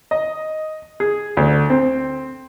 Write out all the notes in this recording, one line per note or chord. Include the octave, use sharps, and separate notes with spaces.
D#5
G#4
D2
C4